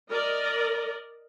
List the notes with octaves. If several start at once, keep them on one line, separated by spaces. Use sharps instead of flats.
A#4 D5 D#5